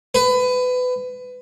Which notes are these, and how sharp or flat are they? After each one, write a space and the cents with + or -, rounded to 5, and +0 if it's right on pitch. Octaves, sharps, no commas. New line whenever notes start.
B4 +25